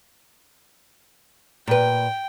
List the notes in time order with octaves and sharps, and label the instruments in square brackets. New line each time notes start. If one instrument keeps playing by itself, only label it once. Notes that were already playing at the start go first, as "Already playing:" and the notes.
[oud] A#2 B4 [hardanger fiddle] G5